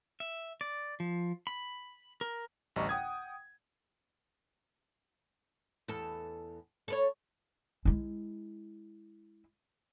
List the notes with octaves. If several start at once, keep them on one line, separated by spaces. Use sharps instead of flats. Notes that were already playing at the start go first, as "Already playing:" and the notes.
E5
D5
F3
B5
A#4
A1 D2 G3 D#5 A#5 C#6
F#5 G5 D#6 G#6
E2 A4
A4 B4 C#5
G#3 E4